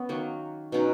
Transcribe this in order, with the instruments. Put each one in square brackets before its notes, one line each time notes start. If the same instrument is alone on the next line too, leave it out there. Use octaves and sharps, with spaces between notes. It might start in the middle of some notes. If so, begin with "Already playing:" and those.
Already playing: [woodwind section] B3 [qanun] C#4
[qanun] D#3 F#3 A#3
[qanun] B2 F#3 C#4 [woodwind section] D#4